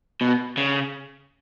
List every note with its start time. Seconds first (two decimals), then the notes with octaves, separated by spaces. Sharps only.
0.21 B2
0.57 C#3